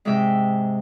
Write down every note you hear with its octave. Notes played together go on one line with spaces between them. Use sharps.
G#2 C3 G#3 G#4 E5 G5